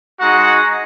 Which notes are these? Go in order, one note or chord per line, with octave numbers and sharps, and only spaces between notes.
G#3 D#4 F#4 F#5